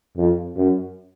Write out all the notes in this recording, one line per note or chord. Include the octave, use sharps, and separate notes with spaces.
F2
F#2